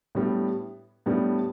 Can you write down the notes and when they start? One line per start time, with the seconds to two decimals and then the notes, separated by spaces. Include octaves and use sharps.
0.15 A2 G3 B3 D4
1.06 A2 G3 B3 D4